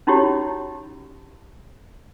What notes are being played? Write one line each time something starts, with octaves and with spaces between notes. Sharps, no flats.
C#4 D#4 E4 F#4 G4 C#5